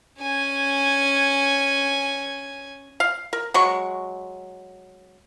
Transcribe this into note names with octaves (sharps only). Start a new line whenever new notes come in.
C#4 G#5
F5
A#4
F#3 G#3 C#6